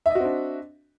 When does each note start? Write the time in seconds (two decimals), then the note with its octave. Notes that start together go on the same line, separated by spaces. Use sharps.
0.06 E5
0.10 D#5
0.15 F#4
0.20 C4
0.25 D4